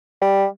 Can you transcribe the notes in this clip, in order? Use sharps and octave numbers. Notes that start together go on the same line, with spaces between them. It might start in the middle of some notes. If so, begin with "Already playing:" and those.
G3